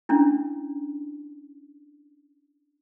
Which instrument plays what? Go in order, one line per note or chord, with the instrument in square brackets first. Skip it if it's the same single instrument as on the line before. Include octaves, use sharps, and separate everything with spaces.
[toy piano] C#4 D4 E4